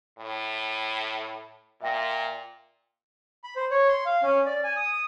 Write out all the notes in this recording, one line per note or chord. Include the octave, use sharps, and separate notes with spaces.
A2
A#2 E5 G5 A#6
B5
C5
C#5
C6
F5
C#4
D5
G#5
D#6
D#6